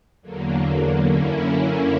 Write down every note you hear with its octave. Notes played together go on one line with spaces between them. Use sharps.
E2 D3 F#3 A#3
F#2 D3 A#3 C#4 E4